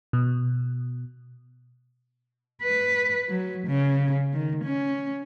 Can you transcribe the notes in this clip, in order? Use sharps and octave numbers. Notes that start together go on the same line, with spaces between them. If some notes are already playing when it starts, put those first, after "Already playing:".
B2
B4
F#3
C#3
D#3
C#4